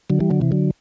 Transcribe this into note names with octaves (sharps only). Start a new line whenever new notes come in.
D3 F#3
E3 G3
D3 F#3
C3 E3
D3 F#3